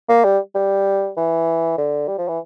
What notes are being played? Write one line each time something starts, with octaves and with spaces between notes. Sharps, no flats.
A#3
G3
G3
E3
D3
G3
F3
E3